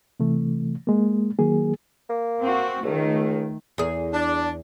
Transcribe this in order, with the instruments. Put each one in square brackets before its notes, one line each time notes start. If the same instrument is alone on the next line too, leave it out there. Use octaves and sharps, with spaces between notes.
[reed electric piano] C3 E3 A3
G#3 A#3
D#3 F#3 A#3 G#4
[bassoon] A#3
[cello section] C4 F#4
[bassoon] C#2 [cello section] D#3 A3
[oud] E2 G#4
[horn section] D4